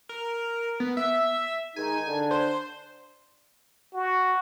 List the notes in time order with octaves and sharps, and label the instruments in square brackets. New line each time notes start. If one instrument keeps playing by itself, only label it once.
[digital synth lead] A#4
B3
E5
[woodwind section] D#3 G#3 D#4 [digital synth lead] G#5
[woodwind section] D3 D4
[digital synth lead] C5
[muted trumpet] F#4